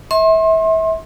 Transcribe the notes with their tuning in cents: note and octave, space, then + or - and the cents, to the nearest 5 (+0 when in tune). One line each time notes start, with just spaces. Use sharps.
E5 -30 C6 +35